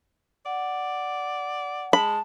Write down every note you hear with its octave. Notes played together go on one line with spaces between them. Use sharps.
D5 F#5
G#3 A5 B5